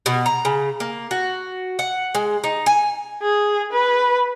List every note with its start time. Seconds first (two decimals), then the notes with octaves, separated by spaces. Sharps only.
0.06 B2
0.26 A#5
0.45 C#3
0.80 A#3
1.11 F#4
1.79 F#5
2.15 G#3
2.44 D#4
2.66 G#5
3.22 G#4
3.72 B4